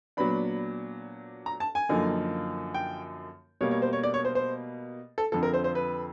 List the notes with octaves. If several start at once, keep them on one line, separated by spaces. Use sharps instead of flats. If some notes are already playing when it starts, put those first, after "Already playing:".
A#2 F#3 B3 D4 B5
A#5
A5
G#5
F#2 D3 F3 A#3 D#4
G5
B2 G3 A#3 C#5
C#5
C5
C#5
D5
C#5
C5
C5
A4
F2 D3 F3 A4
A#4
C5
C5
B4